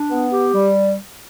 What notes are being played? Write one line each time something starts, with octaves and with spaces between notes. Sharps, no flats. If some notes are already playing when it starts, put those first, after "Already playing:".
Already playing: D4
B3
G4
G3